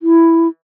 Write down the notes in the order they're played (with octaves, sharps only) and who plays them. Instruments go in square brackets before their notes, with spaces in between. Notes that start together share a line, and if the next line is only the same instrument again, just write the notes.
[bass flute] E4